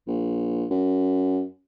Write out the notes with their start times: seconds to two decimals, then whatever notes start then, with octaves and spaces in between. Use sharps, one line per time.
0.07 A#1
0.71 F#2